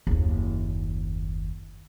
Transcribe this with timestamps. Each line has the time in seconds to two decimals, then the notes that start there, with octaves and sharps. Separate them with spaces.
0.07 F#1 D#2